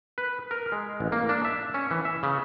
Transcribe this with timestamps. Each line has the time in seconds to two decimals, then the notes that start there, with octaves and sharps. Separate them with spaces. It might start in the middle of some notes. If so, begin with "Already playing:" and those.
0.18 B4
0.51 A#4
0.72 G#3
1.00 A1
1.12 A#3
1.29 D4
1.45 E5
1.74 C#4
1.91 E3
2.05 E5
2.23 C#3